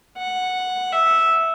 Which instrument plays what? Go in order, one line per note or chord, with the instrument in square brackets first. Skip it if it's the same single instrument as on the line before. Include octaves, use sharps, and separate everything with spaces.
[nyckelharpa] F#5
E5